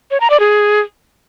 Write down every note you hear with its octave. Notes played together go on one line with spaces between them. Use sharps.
C#5
A#5
D5
G#4